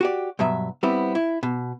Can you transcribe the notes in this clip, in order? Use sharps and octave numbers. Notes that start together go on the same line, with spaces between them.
F#4 G4 D5
G2 B2 F#3 E5
G3 B3 C4 E4
E4
B2